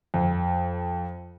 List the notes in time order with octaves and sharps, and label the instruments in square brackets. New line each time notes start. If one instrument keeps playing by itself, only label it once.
[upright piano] F2